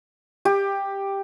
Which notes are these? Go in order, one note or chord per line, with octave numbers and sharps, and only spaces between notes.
G4